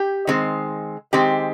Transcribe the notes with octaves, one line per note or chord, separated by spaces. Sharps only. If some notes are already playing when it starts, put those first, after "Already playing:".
Already playing: G4
D#3 G#3 C4
D#3 G#3 C4 G4